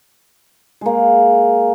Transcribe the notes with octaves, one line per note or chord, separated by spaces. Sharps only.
G#3 A#3